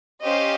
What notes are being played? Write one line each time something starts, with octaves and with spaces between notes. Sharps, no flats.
C#4 G4 C5 D#5 F5